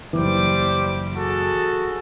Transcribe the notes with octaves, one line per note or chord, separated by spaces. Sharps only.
F#1 C#2 E3 G3 C5 D6
F#4 G#4 A4